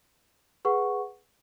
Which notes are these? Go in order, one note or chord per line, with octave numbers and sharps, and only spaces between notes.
G#4 B4 F#5 C#6